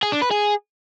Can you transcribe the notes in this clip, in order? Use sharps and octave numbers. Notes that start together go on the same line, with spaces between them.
G#4
D4
B4
G#4